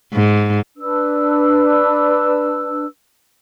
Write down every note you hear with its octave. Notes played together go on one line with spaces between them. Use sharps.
G#2
D4 B4 E6